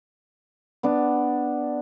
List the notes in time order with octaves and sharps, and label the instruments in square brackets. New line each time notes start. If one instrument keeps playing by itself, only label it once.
[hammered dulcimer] B3 D4